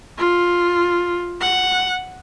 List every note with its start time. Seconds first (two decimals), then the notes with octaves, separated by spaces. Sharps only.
0.18 F4
1.41 F#5